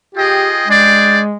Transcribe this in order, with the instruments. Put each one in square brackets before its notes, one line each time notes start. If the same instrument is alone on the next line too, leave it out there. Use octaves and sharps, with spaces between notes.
[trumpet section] F4 G#4 D#5 G5 [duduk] G4
[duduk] G#3 [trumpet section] D4 G#4 D5 G5